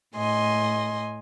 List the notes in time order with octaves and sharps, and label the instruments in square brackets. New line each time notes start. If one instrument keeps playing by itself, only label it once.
[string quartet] A2 D#5 G#5 C6